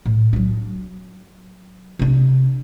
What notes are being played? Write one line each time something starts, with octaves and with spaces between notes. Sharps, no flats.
A2
F#3 D4
C3 D4